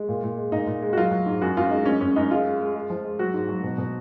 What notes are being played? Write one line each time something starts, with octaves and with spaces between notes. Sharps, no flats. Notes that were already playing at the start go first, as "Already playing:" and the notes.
Already playing: G#3
A#2
A#2
G#3
A#2 D#4
A#2
G#3
F#4
F#3 F4
F#3
G#2
F#2 F#4
F#2 F4
G#3 D#4
F#2 C#4
F#2 C#4
F#2 D#4
G#3 F4
G#3
G#3
G#3
F3
G#3
F#3 F#4
G#2
F#3
B2
B2